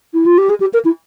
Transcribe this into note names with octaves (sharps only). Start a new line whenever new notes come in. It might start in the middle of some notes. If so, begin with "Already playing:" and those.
E4
F4
G4
G#4
G4
A#4
E4